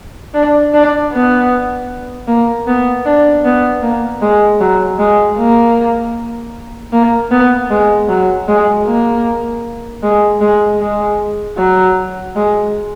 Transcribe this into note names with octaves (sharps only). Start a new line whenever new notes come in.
D4
D4
B3
A#3
B3
D4
B3
A#3
G#3
F#3
G#3
A#3
A#3
B3
G#3
F#3
G#3
A#3
G#3
G#3
G#3
F#3
G#3